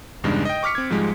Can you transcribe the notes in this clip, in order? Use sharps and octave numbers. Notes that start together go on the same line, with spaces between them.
E2 G2 C#3 G#3 D4 D#4
D#5 G5
C#6 D6 F6 B6 C#7
C4 G#6
G#2 F3 G3 G#3